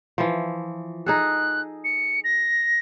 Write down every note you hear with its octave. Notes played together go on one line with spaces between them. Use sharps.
E3 F3
D#4 G#4 A4 F#6
C#7
A#6